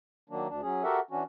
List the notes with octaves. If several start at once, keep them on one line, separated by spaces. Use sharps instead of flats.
D#3 F#3 A#3 D4
D2 D4
F#3 C#4 G#4
F#4 G4 A4 A#4 E5 F#5
E3 C#4 D4 F#4